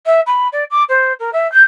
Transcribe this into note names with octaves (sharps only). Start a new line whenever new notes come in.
E5
B5
D5
D6
C5
A#4
E5
G6